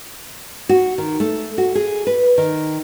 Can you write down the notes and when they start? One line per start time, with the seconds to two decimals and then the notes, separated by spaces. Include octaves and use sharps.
0.69 F#4
0.98 D#3
1.20 A3
1.58 F#4
1.75 G#4
2.07 B4
2.38 D#3